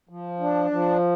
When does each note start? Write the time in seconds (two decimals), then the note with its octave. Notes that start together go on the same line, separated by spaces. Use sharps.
0.09 F3
0.40 D4
0.71 F3